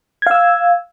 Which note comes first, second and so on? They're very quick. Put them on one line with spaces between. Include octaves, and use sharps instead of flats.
G#6 F5 E6